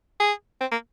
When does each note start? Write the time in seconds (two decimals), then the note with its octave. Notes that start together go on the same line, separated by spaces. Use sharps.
0.20 G#4
0.61 C4
0.72 A#3